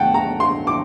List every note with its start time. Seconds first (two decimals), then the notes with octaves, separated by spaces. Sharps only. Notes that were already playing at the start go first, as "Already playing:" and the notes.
Already playing: D2 F#5 G5 A5
0.14 A#5
0.40 C6
0.67 D6